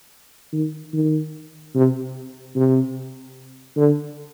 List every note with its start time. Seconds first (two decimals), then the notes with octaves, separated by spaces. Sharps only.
0.52 D#3
0.93 D#3
1.75 C3
2.55 C3
3.77 D3